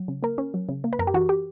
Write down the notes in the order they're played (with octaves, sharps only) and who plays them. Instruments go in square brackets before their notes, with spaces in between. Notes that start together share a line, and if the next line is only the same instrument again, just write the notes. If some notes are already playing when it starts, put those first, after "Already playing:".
Already playing: [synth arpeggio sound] F#3
C#3
A#3 A#4
C#4
F#3
C#3
A#3
B4
F#2 A#4
G4
E3 F#4
G4